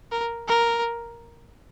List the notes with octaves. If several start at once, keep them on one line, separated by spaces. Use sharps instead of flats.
A#4
A#4